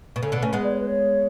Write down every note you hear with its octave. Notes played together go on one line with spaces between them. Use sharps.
B2
C#3 A4
B2 D3
A3 C#4 B4
G#3 B3
D5
C#5
B4
C#5